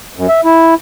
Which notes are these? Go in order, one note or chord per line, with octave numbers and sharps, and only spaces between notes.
F#2
E5
E4